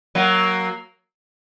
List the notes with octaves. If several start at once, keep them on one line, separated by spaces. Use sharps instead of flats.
F#3 A#3